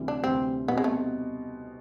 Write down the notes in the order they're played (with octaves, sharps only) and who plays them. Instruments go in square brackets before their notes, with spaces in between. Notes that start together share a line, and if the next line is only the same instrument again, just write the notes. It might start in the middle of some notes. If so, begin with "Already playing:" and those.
Already playing: [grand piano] D2 C3 E3 G3
[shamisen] D4
[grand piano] D2 C3 E3 G3 [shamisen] C4
[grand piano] B2 G3 C4 D#4 F#4 [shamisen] B3
[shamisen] G#3
A3